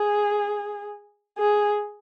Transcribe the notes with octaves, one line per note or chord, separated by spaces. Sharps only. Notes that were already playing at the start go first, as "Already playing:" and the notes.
Already playing: G#4
G#4